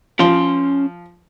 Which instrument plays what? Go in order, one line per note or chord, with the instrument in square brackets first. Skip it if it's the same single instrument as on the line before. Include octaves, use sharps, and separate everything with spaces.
[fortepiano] F3 [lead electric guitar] C#4 C6